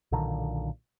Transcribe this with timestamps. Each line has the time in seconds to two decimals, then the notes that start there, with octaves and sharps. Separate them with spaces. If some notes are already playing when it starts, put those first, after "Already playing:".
0.12 B1 A#2 D3 D#3